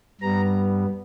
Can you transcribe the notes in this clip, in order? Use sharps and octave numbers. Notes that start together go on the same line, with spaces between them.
G2 G3 B3 A#5